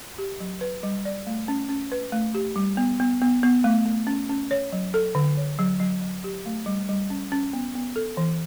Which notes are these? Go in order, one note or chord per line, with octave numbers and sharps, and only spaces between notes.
G4
F#3
B4
G3
D5
A3
C#4
C#4
B4
A3
G4
G3
B3
B3
B3
B3
A3
A3
C#4
C#4
C#5
F#3
A4
D3
C#5
F#3
F#3
F#3
G4
A3
G3
G3
C#4
C#4
B3
B3
A4
E3